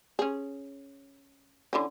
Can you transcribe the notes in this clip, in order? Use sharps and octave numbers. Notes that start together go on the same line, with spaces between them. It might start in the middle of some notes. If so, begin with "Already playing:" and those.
C#4 G#4
D3 E3 C#4